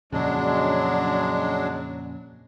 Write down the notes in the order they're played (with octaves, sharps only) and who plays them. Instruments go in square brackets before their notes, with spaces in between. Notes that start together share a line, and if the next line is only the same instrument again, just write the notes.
[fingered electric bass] F2 A#2 C#3 [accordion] F#3 G#3 D4